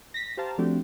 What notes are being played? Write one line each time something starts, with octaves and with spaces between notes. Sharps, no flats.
A#6 B6
G4 C5 F5 A5 A#5
F3 A3 C4 D4 F#4 G4